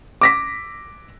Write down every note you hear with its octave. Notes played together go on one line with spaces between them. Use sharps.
D6 A#6 B6